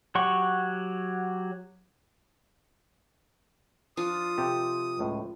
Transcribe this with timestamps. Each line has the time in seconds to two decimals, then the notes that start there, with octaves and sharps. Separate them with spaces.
0.15 F#3 G4 F#5 C#6
3.97 F3 D4 F4 D#6
4.38 C3 G4 A4
4.99 C#2 A2